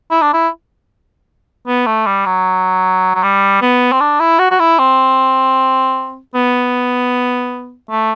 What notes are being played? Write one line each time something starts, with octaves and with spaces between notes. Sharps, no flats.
E4
D4
E4
B3
A3
G3
F#3
F#3
G3
B3
C4
D4
E4
F#4
F#4
E4
C4
B3
A3